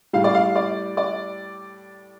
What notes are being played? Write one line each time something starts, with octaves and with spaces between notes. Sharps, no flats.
A2 G3 F5
D5
F5
D5
D5